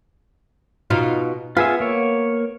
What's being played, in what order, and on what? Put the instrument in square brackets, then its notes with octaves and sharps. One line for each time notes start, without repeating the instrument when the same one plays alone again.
[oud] B2 D#4 F4
[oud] B3 [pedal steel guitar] F4 G#4 E5
[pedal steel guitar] A#3 C#5